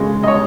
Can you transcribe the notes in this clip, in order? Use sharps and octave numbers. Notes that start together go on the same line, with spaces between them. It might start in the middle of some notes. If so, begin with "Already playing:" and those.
Already playing: C#3 G#3
D#5
C#5